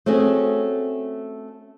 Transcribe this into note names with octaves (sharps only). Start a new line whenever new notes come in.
A3 C4 C#4 F#4 G#4